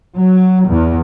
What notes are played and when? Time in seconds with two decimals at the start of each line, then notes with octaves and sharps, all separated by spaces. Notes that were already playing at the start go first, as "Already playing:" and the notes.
0.16 F#3
0.68 E2